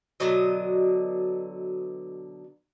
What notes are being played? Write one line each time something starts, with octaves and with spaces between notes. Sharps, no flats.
B2 D3 F#3 D#5